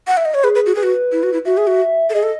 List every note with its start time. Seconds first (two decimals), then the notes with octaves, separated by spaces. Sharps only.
0.07 F#5
0.17 E5
0.25 D#5
0.34 C#5
0.43 G#4 B4
0.55 B4
0.66 F#4
0.75 G#4 B4
0.83 F#4
1.12 E4
1.23 F#4
1.33 E4
1.45 F#4 E5
1.57 G#4
1.67 F#4
2.10 A4
2.14 G#4 D#5
2.23 A4